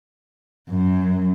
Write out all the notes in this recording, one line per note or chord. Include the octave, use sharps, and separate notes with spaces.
F#2